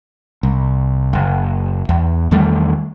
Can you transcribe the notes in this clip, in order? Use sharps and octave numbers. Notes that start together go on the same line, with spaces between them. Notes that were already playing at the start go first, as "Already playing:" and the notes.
C2
F#1
E2
E2 D#3 G3 A3